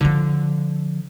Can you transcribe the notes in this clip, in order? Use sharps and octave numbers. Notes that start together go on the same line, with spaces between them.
D3 F3